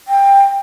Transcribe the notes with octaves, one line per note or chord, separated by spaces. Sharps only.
G5